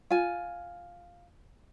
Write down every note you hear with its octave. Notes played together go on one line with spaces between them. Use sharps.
F4 G#5